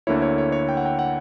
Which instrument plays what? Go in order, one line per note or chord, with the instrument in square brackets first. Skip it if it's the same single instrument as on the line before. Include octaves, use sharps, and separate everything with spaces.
[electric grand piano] D2 D3 A#3 E4 C#5
C#5
C#5
C#5
G5
F#5
G5
F#5